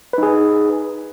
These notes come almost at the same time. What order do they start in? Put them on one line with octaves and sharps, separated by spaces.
B4 D#4 G#4